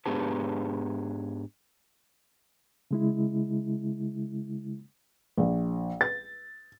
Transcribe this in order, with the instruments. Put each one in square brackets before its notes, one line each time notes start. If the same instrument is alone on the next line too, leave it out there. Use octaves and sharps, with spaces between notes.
[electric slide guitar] G#2 B3 D4 G4 G#4 A5
[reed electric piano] C#3 G#3 E4
[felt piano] A#1
A6